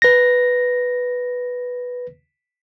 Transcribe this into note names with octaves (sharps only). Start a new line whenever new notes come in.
B4 A#6